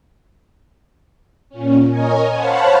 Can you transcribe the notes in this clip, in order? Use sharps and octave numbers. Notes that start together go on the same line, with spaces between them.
A#2 C#4
A#4 C#5 D#5 G#5
C5 C#5 F5 F#5 A5 B5